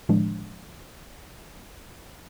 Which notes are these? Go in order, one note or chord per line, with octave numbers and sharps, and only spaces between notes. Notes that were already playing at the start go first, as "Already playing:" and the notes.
A2 D3 D#3 F3 G#3 D4